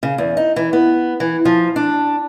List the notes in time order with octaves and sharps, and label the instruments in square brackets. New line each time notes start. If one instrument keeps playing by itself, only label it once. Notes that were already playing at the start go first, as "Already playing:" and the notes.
[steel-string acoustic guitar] C#3
E2
D#4
E3
B3
E3
F3
D4